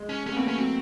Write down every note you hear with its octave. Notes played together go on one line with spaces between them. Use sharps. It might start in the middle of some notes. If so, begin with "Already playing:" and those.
Already playing: G#3
C#4
A3 C#4
B3
A#3 C4
A3 C#4
F#3 C4